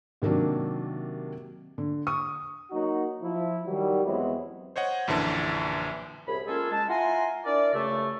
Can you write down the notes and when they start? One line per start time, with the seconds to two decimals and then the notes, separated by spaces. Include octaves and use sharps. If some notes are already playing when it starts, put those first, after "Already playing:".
0.22 C3 D#3 F#3 A#3 D4
1.78 D3
2.07 C#6 D#6
2.71 F#3 A#3 D#4 F#4
3.22 F3 E4
3.66 D#3 F#3 G3
4.04 E2 F#3 G#3 B3 C4 E4
4.76 C5 C#5 D#5 F#5
5.08 A#1 F#2 D3 E3 A5
6.27 C2 F#2 G#4 B5
6.46 G#3 A#3 C#4 F4 G#4 A4
6.70 G#3 A5
6.88 E4 F4 F#5 G#5 A#5 C6
7.44 D4 E4 A#4 D5
7.73 C#2 F#2 C#3 A3